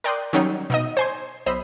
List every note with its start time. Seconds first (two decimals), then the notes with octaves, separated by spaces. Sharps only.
0.04 A#4 D5 G5 C6 D#6 F#6
0.33 D#3 F#3 G3 C#4 D#4
0.70 B2 D#4 D#5
0.97 C5 G#5 C6
1.46 B1 C5 D#5 B5 E6